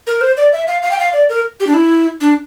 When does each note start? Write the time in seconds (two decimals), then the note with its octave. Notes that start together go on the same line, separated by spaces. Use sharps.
0.07 A#4
0.21 C5
0.37 D5
0.53 E5
0.67 F5
0.82 F5
0.91 G5
0.99 F5
1.13 D5
1.29 A#4
1.60 G4
1.67 D4
1.74 E4
2.21 D4